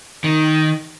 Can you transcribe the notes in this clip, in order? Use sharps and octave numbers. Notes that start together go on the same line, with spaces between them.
D#3